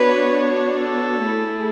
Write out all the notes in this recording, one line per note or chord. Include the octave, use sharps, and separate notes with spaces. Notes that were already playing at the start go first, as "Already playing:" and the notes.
Already playing: B3 D4 F#4 B4 C#5
A4
A3 E4 G#4